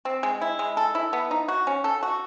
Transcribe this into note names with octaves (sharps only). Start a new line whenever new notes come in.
C4
G#3
E4
G#3
A4
E4
B3
D#4
F#4
C#4
A4
F#4